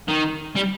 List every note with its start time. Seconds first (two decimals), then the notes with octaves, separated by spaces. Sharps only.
0.08 D#3
0.56 G3